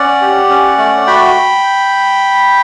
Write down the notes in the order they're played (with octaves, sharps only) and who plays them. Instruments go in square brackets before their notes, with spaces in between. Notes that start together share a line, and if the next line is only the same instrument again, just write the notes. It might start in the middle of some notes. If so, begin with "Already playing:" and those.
Already playing: [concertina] C#4 D5 F#5
G4
C#4
A3
F#4 G5 B5